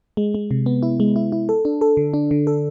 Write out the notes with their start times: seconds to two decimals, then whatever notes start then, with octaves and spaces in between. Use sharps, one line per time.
0.17 G#3
0.35 G#3
0.51 C3
0.66 B3
0.83 E4
1.00 G#3
1.16 E4
1.32 E4
1.49 A4
1.65 D4
1.81 A4
1.97 D3
2.14 D4
2.31 D3
2.47 A4